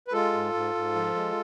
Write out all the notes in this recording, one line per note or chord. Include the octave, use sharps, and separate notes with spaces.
B4
G#3 F4 A4
G#2
G#2
G#2
F3
G#3